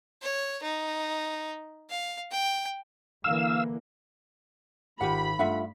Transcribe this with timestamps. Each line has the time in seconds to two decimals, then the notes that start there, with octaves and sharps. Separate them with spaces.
0.22 C#5
0.63 D#4
1.90 F5
2.32 G5
3.24 D3 E3 A#3 F5 E6
5.01 G#1 F4 G4 F#5 B5
5.39 G2 A3 F4 E5 F#5